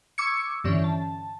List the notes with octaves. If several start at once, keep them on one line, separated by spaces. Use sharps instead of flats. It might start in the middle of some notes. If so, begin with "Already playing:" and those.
C#6 D6 E6 G#6 C#7
G2 D3 E3 C#4
A5